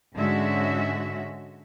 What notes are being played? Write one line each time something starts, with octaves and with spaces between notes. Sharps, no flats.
G#2 D3 G#3 C#4 F#4 E5